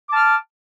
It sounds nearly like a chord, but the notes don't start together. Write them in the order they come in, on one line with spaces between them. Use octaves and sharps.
D6 A5 F6